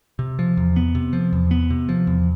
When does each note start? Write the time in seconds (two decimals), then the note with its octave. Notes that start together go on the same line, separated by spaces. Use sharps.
0.19 C3
0.39 F3
0.57 E2
0.76 B3
0.95 C3
1.13 F3
1.32 E2
1.51 B3
1.70 C3
1.89 F3
2.07 E2